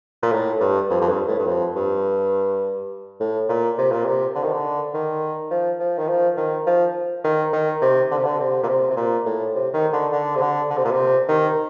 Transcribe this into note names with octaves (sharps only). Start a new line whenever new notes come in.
A#2
A2
G2
F2
F2
G2
A2
G2
F2
G2
A2
A#2
C3
A#2
C3
D3
D#3
D3
D#3
F3
F3
D#3
F3
D#3
F3
D#3
D#3
C3
D3
C3
D3
C3
A#2
C3
C3
A#2
A2
C3
D#3
D3
D3
C3
D3
D3
C3
A#2
C3
D#3